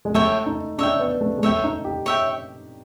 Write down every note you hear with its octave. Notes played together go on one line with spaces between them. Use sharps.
G#3
A3 C#5 E5 G5
D#4
D4 C#5 E5 G5
B3
A3
G#3
A3 C#5 E5 G5
D#4
G4
C#5 E5 G5